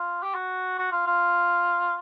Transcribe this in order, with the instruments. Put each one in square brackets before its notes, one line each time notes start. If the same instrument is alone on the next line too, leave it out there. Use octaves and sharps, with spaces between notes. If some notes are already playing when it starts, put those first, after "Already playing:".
Already playing: [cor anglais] F4
G4
F#4
F#4
F4
F4